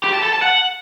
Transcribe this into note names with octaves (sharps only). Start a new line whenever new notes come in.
G4
A5
A4
A5
F#5